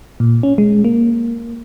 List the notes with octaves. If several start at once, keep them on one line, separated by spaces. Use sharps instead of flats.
A#2
C#4
G#3
A#3